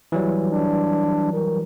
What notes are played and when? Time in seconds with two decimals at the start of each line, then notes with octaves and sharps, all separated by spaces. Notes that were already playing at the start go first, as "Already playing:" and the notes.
0.12 E3 F#3 G3
0.52 D4
1.34 A#4